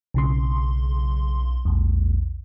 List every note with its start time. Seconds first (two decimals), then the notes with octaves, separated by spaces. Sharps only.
0.14 B1 C#3 C6
1.65 A#1 E2